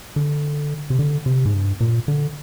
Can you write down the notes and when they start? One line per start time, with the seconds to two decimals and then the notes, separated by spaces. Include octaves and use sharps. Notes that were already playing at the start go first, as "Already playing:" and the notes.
0.16 D3
0.90 C3
0.99 D3
1.26 C3
1.45 G#2
1.54 G2
1.81 A#2
2.08 D3